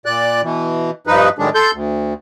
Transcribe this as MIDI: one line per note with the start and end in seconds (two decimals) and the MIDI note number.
0.06 0.41 46
0.06 0.41 74
0.06 0.41 90
0.43 0.91 47
0.43 0.91 52
1.07 1.29 43
1.07 1.29 53
1.07 1.29 63
1.07 1.29 71
1.39 1.50 45
1.39 1.50 51
1.39 1.50 54
1.39 1.50 56
1.39 1.50 62
1.55 1.71 69
1.55 1.71 84
1.55 1.71 91
1.73 2.14 38